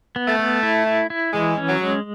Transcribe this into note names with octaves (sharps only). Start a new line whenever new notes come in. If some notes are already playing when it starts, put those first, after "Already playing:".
B3
A3
B3
E4
E4
E4
E3 G#3
C#4
F#3
G#3